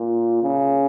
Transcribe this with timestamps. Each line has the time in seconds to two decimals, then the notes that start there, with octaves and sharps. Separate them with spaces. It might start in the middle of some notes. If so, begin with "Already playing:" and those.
Already playing: A#2
0.43 C#3